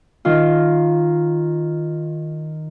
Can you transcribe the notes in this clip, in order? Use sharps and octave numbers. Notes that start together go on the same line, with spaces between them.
D#3 F4